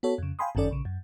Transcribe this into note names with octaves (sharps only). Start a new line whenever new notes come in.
B3 F#4 A4 C#5
F2 C#3
F5 G5 G#5 B5 C6 D#6
G1 F#2 D#3 C#4 A4 D5
A#1 C#3
F#2